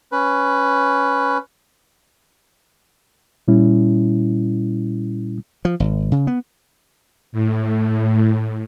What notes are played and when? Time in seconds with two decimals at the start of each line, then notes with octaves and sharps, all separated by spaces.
0.12 C#4 B4
3.48 A#2 G3 C#4 E4
5.65 F3
5.80 G#1
6.12 C#3
6.27 B3
7.32 A2